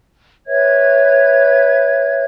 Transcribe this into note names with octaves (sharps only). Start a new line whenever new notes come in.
B4 C#5 E5 G#6